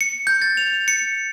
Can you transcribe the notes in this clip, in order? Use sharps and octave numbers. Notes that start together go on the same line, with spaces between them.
C#7
G6
A6
F7
C#7